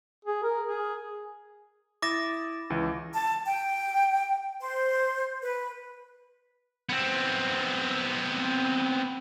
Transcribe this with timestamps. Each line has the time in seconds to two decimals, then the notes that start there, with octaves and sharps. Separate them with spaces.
0.25 G#4
0.44 A#4
0.67 G#4
2.02 E4 D6 D#6 A6 A#6 E7
2.70 C#2 E3
3.13 A5
3.46 G5
4.60 C5
5.42 B4
6.89 B3 C4